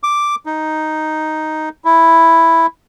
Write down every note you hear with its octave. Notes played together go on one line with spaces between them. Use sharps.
D6
D#4
E4